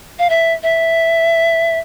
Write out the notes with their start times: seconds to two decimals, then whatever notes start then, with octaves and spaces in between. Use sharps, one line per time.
0.19 F5
0.30 E5
0.63 E5